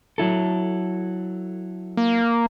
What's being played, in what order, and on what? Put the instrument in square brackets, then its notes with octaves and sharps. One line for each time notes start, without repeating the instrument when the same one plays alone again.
[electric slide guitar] F#3 E4 A4
[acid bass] A#3